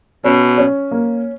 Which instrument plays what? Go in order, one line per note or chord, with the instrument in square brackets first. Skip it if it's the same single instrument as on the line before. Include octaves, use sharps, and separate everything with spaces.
[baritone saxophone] B2 [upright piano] C#4
[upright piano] C#4
A#3